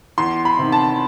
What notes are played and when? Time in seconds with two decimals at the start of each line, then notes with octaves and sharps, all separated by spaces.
0.18 E2 C6
0.45 B5
0.59 C3 D#3
0.72 A5